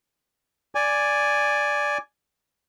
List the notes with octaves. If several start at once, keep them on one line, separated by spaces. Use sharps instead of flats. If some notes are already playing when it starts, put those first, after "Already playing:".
D5 G#5